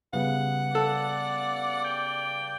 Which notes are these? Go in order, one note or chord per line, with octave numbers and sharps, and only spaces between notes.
C#3 G3 B3 F#5
A4 D5
G5